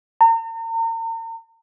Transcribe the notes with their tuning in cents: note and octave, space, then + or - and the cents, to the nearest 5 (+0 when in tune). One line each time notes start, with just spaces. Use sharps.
A#5 -40